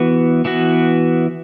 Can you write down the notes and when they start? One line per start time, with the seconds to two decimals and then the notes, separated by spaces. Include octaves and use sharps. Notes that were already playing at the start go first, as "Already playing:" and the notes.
Already playing: E3 B3 F#4
0.45 E3 B3 F#4